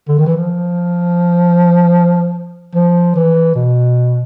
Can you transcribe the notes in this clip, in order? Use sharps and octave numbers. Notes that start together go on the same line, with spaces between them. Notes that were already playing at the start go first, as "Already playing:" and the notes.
D3
D#3
E3
F3
F3
E3
B2